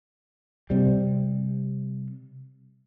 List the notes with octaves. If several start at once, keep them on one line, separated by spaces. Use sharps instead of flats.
C3 G3